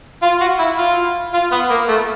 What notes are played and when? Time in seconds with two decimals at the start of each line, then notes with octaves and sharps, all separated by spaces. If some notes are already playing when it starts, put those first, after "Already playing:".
0.22 F4
0.41 F#4
0.59 E4
0.78 F4
1.34 F4
1.52 B3
1.70 A#3
1.88 A3